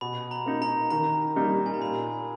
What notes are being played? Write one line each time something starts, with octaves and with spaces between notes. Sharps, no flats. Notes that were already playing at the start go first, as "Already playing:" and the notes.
B2 B5
A#5
A#3 D#4
A#5
D#3 A#5
G3 A#3 D#4
G#5
A#5
A#2 B5